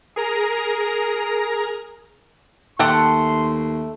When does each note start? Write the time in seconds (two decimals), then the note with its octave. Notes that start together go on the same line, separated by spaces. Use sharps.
0.16 G#4 A#4 A#5
2.79 D#2 A3 G4 A4 F#5 C6